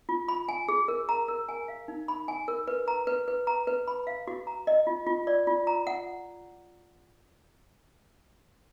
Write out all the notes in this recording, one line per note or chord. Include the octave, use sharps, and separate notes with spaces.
F4
B5
G#5
G#4
A#4
A#5
A#4
G#5
F5
D#4
B5
G#5
A#4
B4
A#5
B4
B4
A#5
B4
B5
F5
F#4
A#5
D#5
F4
F4
D5
F4
A#5
F#5